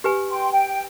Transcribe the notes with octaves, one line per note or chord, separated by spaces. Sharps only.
G4 B4 G#5
G5 C6
G5